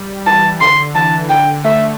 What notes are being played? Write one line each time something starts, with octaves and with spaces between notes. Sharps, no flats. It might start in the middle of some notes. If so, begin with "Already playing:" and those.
Already playing: G3
E3 A5
D3 C6
E3 A5
D3 G5
A3 E5